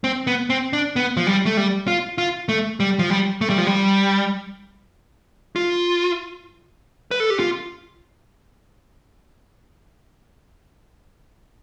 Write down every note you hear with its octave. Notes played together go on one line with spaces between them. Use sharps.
C4
B3
C4
D4
B3
F3
G3
A3
G3
F4
F4
A3
G3
F3
G3
A3
G3
F3
G3
F4
B4
A4
G4
F4